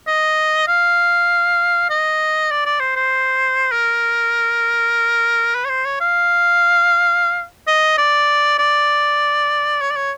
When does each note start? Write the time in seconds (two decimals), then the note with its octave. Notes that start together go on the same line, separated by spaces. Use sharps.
0.07 D#5
0.67 F5
1.90 D#5
2.51 D5
2.66 D5
2.80 C5
2.96 C5
3.71 A#4
5.55 B4
5.65 C#5
5.69 C5
5.85 C#5
6.00 F5
7.67 D#5
7.98 D5
8.59 D5
9.81 C#5
9.91 D5
9.96 C#5